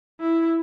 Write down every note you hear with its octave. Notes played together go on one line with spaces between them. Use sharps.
E4